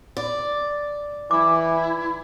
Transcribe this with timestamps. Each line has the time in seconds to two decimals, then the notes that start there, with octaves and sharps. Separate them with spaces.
0.17 D5
1.31 E3 E4 D6